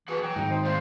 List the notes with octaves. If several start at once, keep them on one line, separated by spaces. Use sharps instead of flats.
E3 F#4 G#4 F#5
F#3 G5
G#2 D#3 D#4
C5
A3 C5 D5 F5